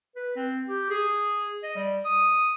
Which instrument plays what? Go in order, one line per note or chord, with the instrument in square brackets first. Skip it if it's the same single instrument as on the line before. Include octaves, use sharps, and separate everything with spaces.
[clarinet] B4
C4
G4
G#4
D#5
G3
D#6